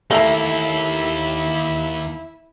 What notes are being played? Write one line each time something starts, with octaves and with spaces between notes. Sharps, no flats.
D#2 A3 A#3 E4 E5 A#5